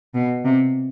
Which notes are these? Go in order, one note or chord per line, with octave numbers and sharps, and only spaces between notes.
B2
C3